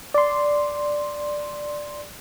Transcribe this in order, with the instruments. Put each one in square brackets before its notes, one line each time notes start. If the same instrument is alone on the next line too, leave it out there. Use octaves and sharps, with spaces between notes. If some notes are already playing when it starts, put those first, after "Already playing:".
[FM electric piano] D5 C6